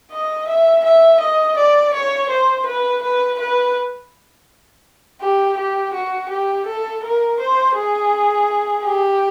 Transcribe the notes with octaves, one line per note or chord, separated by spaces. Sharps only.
D#5
E5
E5
D#5
D5
C#5
C5
B4
B4
B4
G4
G4
F#4
G4
A4
A#4
C5
G#4
G4